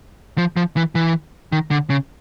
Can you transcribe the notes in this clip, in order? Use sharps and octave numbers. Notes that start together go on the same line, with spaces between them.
F3
F3
E3
E3
D#3
D3
C#3